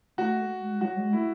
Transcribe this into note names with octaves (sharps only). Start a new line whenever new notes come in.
A3 F#4
G#3
F#3 F#4
G#3
A3 E4